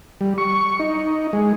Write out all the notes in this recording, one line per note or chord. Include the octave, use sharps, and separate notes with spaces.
G3
C#6
D#4
G#3